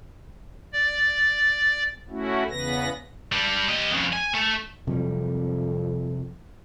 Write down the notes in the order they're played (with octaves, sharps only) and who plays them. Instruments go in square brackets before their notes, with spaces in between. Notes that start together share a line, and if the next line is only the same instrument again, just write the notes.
[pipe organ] D5
A3 C#4 E4 F#4
E2 C#3 B3 B4 A#6
[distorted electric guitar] G3 D4
G4 D#5
F2 C#3
G#5
A3
[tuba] F2 [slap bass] C3 F#3 G3